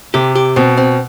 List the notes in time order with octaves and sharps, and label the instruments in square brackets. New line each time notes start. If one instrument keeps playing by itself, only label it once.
[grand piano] C3 [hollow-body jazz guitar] G4
[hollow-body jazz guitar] G4
[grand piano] B2 [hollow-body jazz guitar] C4
[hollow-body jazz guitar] C4